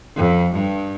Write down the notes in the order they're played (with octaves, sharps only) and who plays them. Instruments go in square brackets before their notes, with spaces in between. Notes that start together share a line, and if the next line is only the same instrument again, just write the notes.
[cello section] F2
G2